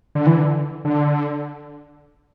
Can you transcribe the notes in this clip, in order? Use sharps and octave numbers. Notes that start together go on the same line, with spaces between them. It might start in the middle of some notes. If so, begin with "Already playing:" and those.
D3
E3
D3
D3